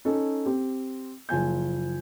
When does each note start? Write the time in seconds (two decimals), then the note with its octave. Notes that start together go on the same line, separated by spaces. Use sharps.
0.05 C#4 D#4 A4
0.46 C4 G4
1.29 F#1 F3 G#5 G6